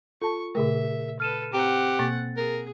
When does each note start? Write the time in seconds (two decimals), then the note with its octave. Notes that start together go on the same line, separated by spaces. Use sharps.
0.22 F4 A4 A5 C#6
0.55 A#2 C#3 A3 G#4 A#4 E5
1.20 A4 B4 F6 D#7 E7
1.53 C4 G4 F#5 A#5
1.99 B2 A#3 A6
2.37 G#4 A#4